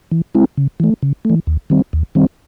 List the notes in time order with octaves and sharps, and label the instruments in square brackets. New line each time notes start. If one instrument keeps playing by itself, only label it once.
[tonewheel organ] E3
G#3 C4 E4
C#3
E3 A3
C#3
E3 A3
D#2
D#3 G3 C4
D#2
D#3 G3 C4